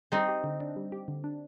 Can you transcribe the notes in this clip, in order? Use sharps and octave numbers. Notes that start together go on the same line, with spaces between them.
G3 C4 D#4
G4
D3
D4
G3
G4
D3
D4